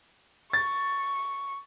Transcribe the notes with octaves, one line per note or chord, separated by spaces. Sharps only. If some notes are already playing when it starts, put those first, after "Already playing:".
C#6 A6